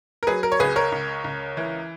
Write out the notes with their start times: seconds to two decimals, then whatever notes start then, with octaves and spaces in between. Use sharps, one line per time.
0.23 A#4
0.27 F#3 G#4 B4
0.43 A#4
0.52 C#5
0.59 C#2 G#4 B4
0.76 A#4 C#5
0.92 C#2
1.24 C#2
1.57 E3